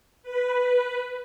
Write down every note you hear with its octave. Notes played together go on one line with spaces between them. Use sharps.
B4